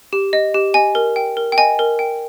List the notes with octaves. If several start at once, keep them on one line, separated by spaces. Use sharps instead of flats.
G4
D#5
G4
D#5 G#5
A#4
G5
A#4
G5
D#5 G#5
A#4
G5